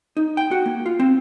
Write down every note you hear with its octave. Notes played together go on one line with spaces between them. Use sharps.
D#4
G5
F#4
A#3
F4
C4